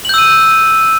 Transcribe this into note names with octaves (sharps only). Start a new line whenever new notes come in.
E6 G6 D#7 F#7